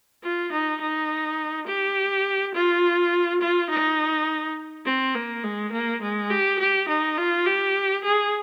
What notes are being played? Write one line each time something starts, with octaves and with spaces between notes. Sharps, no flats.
F4
D#4
D#4
G4
F4
F4
D#4
C4
A#3
G#3
A#3
G#3
G4
G4
D#4
F4
G4
G#4